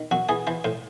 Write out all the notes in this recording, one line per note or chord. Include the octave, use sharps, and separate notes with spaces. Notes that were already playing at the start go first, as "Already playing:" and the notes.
Already playing: D#3
F#2 F#4
E3 G#4
E3 C5
A2 C5